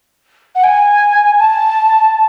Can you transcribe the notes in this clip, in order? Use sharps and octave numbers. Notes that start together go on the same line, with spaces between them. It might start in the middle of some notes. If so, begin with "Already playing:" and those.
F#5
G#5
A5